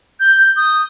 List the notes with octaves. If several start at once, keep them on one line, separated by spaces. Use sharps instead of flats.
G6
D#6